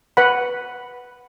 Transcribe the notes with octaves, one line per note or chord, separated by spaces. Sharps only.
B4 F#5 B5